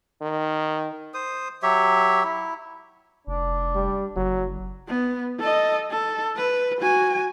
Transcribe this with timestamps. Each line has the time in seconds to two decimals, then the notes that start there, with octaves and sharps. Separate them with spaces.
0.22 D#3
1.14 C5 D#6
1.63 F#3 G4 C#5 E5
2.23 E4
3.27 F1 D4
3.75 G3
4.16 F#1 F#3
4.88 B3
5.40 A4 D#5
5.91 A4
6.36 B4
6.81 F#4 G#5